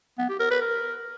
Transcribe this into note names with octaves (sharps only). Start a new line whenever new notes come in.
B3
G4
A#4
B4
A#4